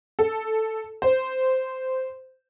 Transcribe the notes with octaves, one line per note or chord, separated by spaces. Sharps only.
A4
C5